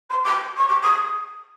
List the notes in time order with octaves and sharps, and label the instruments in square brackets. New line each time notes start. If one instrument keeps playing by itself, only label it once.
[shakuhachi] C6
D6
C#6
D6
D#6